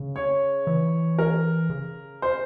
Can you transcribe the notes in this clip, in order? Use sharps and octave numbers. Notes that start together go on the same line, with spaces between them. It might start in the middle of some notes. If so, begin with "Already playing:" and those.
Already playing: C#3
C#5
E3
A#4
C#3
C5